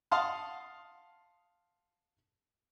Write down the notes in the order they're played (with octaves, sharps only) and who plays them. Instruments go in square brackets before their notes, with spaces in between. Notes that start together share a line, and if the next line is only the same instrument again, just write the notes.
[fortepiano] F5 F#5 A5 C6 D#6 F6